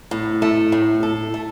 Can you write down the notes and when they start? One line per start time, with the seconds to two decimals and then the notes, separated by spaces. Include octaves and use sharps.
0.11 A2
0.42 A3
0.72 A2
1.03 A4
1.34 A3